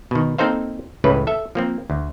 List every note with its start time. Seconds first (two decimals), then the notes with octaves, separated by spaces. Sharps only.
0.11 B2 D#3
0.38 A#3 C4 D#4 A4 C5 F5
1.04 C#2 A2 C#3 E3 B4
1.27 A4 E5
1.55 F3 A#3 C4
1.90 D2